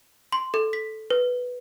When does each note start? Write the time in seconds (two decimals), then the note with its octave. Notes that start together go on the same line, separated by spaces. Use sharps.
0.32 C6
0.54 A4
0.73 B6
1.10 B4